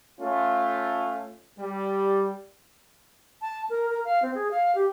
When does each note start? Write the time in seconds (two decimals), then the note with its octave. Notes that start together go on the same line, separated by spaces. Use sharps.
0.21 A3 C#4 F4
1.59 G3
3.41 A5
3.70 A#4
3.90 A#4
4.05 F5
4.22 C4
4.35 G#4
4.51 F5
4.75 G4